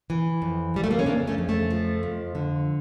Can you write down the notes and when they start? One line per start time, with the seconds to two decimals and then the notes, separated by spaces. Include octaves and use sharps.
0.10 E3
0.42 F2
0.74 F2 G3
0.84 A3
0.91 A#3
0.99 C#4
1.06 C#3 A#3 D4
1.27 A3 C#4
1.38 F2
1.49 A3
1.70 F3
2.03 F2
2.35 D3